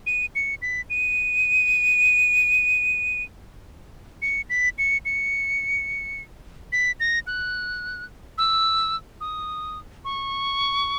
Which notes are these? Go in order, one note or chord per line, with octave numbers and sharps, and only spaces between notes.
D#7
C#7
B6
D#7
C#7
B6
C#7
C#7
B6
A#6
F#6
E6
D#6
C#6